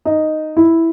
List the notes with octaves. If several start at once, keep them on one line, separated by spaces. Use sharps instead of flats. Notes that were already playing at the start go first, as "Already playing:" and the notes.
D#4
E4